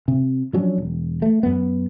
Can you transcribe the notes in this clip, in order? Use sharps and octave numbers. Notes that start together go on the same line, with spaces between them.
C3
F3 F#3 C#4 D4
E1
A3
F#2 B3